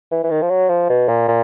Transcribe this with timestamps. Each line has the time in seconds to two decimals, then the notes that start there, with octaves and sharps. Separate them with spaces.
0.11 E3
0.24 E3
0.30 D#3
0.42 F3
0.50 F#3
0.69 F3
0.89 B2
1.08 A#2
1.28 A#2